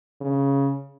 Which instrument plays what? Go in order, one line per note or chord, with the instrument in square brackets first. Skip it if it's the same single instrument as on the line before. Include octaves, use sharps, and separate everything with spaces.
[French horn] C#3